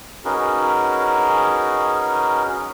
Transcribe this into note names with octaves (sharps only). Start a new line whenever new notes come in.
C#4 D#4 F#4 G#4 A#4 B4